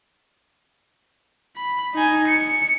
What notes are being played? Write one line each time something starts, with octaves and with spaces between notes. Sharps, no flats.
B5
D#4 G#5
C#7